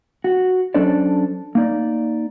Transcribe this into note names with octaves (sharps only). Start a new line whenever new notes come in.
F#4
F#3 C#4 D4 A4 C5 D5
A#3 D#4 D5